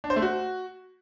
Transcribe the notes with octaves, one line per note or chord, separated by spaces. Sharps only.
D4
C5
A3
F#4